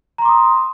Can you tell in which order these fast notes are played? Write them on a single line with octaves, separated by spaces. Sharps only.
A#5 C6 D6 D#6